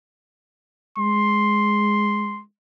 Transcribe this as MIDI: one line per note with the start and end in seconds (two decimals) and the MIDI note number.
0.98 2.42 56
0.98 2.42 84